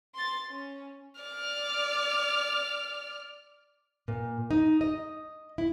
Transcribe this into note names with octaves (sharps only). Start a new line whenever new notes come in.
C6 A6
C#4
D5 F6
A#2
D#4
D#5
E4